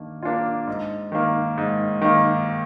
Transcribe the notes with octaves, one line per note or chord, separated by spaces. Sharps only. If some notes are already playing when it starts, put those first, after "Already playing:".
Already playing: D#3 A#3 D4
A#3 D4 F4
G#2
D#3 A#3
G#2
D#3 A#3